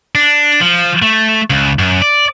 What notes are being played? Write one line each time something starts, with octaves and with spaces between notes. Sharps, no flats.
D4
F3
A3
C#2
F#2
D5